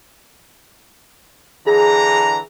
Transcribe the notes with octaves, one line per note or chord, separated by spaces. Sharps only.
D3 E3 G#4 A#5